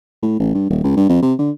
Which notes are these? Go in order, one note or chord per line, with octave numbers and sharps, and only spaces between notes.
A2
A1
G2
D#1
C#2
G2
F2
C3
D3